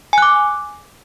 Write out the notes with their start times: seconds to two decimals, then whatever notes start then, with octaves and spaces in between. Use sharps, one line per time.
0.13 G#5
0.18 F#6
0.22 D6